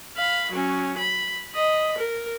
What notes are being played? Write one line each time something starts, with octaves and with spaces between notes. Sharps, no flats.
F5 B5
F#3 C#4
B5
D#5 B5
A#4